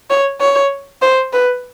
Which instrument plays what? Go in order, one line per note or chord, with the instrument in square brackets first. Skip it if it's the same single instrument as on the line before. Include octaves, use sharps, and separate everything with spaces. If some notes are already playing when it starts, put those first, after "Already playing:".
[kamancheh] C#5
C#5
C5
B4